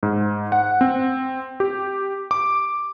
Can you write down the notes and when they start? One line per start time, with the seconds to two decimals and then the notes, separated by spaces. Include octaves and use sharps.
0.03 G#2
0.52 F#5
0.81 C4
1.60 G4
2.31 D6